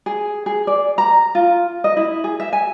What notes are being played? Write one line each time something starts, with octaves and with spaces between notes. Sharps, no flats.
G#4
G#4
D5
A#5
F4
D#5
E4
G#4
E5
G#5